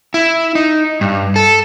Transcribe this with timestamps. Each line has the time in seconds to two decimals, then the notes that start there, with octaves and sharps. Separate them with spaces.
0.14 E4
0.55 D#4
1.01 G2
1.36 A4